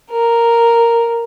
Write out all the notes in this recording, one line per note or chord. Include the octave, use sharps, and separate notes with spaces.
A#4